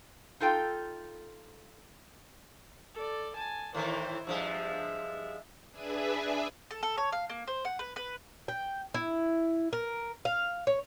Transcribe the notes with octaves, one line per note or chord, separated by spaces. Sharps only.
D#4 F4 A4 G5
A4 D5
G#5 A5
A2 D#3 E3 E4 C5
G2 F3 G#3 E5
D4 G#4 B4 E5 G#5
A4
A4
C#5
F5
A#3
C5
F#5
B4
B4
G5
E4
A#4
F5
C#5